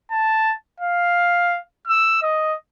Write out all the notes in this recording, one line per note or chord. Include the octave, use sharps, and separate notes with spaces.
A5
F5
E6
D#5